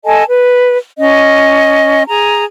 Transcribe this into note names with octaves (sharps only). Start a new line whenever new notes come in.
A4 D#5 G#5 A5
B4
C#4 D#5
G#4 A#5